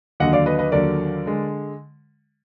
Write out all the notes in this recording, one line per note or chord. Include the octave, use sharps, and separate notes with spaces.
D#2 D3 F#3 D#5 F#5
D5 F5
B4 D#5
B4 D#5
D#2 D3 F#3 A#4 D5
D3 G#3